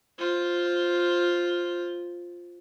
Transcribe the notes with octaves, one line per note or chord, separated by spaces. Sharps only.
F4 C5